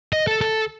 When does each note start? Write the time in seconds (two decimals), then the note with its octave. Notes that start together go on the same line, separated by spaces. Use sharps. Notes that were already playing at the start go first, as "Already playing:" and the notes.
0.13 D#5
0.27 A4
0.41 A4